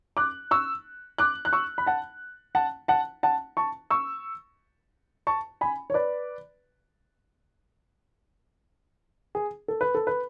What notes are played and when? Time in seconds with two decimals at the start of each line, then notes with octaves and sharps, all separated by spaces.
0.17 D6 F#6
0.51 C#6 E6
1.18 D6 F#6
1.45 F#6
1.53 C#6 E6
1.78 B5
1.86 F#5 A5
2.55 F#5 A5
2.88 F#5 A5
3.23 F#5 A5
3.57 A5 C#6
3.90 C#6 E6
5.27 A5 C#6
5.61 G#5 B5
5.90 C#5
5.94 B4 D5
9.35 G#4
9.68 A4
9.81 B4
9.95 A4
10.07 B4